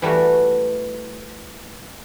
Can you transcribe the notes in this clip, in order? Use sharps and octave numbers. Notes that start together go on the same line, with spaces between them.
E3 G3 A3 F#4